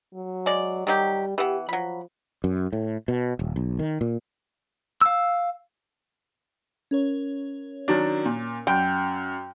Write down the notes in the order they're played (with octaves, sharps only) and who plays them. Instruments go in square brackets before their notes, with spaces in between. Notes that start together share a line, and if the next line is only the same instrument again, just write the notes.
[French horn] F#3
[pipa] G#3 D5
[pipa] D#3 F#3 G4 [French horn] G3
[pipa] E3 B3 [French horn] G4
[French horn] F3 [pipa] F#3 B5
[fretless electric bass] F#2
A2
B2
D#1
B1
D#3
A#2
[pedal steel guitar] F5 E6
[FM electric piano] C#4 A#4 C#5
[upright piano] D#3 F#3 D4
A#2
[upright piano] F#2 [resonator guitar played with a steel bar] G5